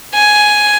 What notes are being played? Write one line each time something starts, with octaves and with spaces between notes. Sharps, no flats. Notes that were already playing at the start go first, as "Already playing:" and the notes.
G#5